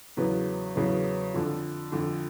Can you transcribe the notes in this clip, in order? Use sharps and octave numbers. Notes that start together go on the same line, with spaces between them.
E2 C#3 F#3 B3
E2 C#3 F#3 B3
F2 D3 F3
F2 D3 F3